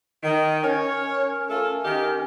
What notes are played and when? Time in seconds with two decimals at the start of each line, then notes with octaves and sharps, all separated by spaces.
0.23 D#3
0.64 C#4 A#4 C#5
1.49 A3 F4 A4
1.84 D#3 G4